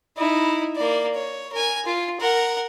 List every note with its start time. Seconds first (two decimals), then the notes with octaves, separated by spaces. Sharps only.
0.17 D#4 E4
0.76 A#3 D5
1.15 C#5
1.53 A#4 G#5
1.86 F4
2.20 A#4 F#5